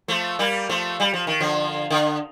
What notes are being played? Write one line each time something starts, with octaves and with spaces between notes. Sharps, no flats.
F3 A3
G3 A#3
F3 A3
G3
F3
D#3
D3 F3
D3